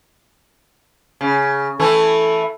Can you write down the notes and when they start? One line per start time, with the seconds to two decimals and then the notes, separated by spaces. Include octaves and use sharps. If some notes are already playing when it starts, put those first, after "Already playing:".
1.21 C#3
1.80 E3 A3 E4 A4